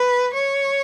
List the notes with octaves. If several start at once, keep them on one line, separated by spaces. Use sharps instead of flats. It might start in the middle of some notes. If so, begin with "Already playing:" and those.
Already playing: B4
C#5